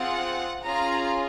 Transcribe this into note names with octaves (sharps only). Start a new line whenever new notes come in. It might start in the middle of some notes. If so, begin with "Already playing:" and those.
Already playing: C4 F4 G#4 F#5
C#4 F4 G#4 A#5